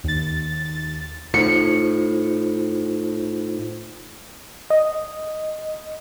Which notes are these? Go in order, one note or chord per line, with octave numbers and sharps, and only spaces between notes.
D#2 A6
A2 D#4 F4 C5 C#7
D#5